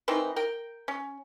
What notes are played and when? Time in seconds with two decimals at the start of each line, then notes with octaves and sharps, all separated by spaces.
0.08 D#3 E3 C4 D#4
0.36 A#4 G5
0.88 C#4